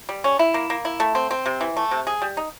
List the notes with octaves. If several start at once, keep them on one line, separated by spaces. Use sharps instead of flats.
G3
C#4
E4
A#3
A#3
E4
A3
C4
C4
C3
E3
A3
C3
G#4
G3
D#4